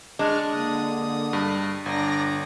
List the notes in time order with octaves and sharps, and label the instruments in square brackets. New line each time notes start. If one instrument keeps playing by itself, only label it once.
[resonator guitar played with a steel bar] G#3 D4 [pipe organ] C#6 F6
[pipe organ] D3 D#6 [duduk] A#3
[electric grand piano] G2
[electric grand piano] G1 [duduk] D4 [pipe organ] D5 A#5 A#6